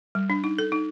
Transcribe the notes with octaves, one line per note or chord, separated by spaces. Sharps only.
G3
D4
D#4
A4
D#4